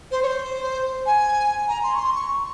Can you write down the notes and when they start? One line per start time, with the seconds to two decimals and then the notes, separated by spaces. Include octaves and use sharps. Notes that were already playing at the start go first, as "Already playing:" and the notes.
0.11 C5
0.23 C#5
0.27 C5
1.06 G#5
1.68 A#5
1.83 C6
1.95 C#6
1.99 C6
2.15 C#6